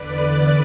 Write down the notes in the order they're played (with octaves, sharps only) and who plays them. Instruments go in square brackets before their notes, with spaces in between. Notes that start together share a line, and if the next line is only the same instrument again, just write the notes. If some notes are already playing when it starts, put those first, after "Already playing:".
Already playing: [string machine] E2 D3 B4 D5